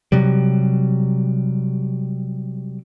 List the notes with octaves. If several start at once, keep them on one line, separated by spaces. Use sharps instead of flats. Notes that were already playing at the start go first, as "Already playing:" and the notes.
C3 F#3 G3